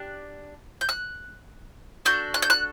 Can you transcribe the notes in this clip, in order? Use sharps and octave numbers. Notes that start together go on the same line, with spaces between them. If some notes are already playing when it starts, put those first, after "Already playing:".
Already playing: D4 G4 F#6
G6
F#6
D4 F#4 A4 G6
F#6
G6
F#6